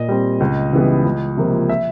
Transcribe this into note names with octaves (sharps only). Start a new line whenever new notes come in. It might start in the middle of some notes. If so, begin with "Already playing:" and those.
Already playing: A#2 D#5
G3 C4
C#2
C#3 E3 G3 B3
C#2
C3 F3 A#3
E5